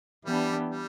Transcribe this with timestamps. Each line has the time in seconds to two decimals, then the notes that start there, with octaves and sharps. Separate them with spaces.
0.25 E3 G3 B3 D4 G4
0.69 G3